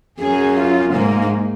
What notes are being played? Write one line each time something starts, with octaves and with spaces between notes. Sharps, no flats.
F#2 G#4
F4
G#2 A#3